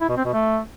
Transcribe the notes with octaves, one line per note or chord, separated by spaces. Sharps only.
E4
B2
C4
B2
A3